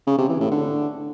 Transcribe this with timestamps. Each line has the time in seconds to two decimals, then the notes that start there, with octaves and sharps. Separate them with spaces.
0.07 C#3
0.18 C3
0.29 E3
0.40 A2
0.51 D3